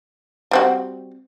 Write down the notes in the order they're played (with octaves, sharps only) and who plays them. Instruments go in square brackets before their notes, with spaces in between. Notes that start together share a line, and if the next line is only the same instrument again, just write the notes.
[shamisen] G3 C4 F#4